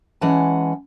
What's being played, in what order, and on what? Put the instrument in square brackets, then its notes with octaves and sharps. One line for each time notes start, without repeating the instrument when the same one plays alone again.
[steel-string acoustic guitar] E3 G#3 C#4 F#5 G#5 A5